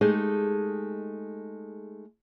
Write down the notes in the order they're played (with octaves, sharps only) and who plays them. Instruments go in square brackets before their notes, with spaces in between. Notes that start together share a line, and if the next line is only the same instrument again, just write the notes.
[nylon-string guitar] G#3 A3 D#4 G4 G#4